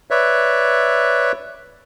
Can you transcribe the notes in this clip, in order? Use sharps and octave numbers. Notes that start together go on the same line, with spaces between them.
B4 C#5 D5 E5